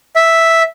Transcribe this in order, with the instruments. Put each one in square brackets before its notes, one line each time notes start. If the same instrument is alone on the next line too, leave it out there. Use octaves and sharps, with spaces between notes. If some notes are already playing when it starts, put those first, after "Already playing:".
[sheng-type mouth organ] E5